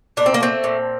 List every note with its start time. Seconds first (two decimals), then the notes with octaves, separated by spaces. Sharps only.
0.17 A#2 D4
0.26 C4
0.34 A#3
0.40 A3 C4
0.64 A#2